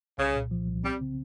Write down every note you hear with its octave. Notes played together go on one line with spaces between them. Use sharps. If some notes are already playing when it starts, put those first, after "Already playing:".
C2 C#3
A#2
F3
C2
G3 C4
C#3